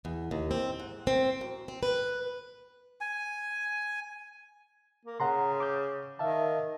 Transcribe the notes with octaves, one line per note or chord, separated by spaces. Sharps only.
E2
D#2
C4
G#2
C4
F#2
C4
B4
G#5
A#3
C#3 F#5 A#5 C6
D6 G6
D#3 E5 F5 A5